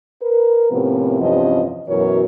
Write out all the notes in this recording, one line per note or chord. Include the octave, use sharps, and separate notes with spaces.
A#4 B4
A2 C3 F3 B3 C#4 A#4
E2 G2 C3 F3 C#4 D#5
F#2 B2 E3 F#4 A#4 C#5